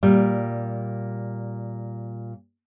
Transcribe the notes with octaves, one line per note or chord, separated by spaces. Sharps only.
A#2 G3